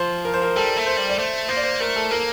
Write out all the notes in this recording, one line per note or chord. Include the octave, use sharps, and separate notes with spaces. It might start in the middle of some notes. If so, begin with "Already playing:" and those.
Already playing: F3 C5
A#4
C5
A#4
G3 A4
A3
C5
G3
D5
A3 C5
A#3 C5
D5
C5
A3 A#4
A4
A#3 A#4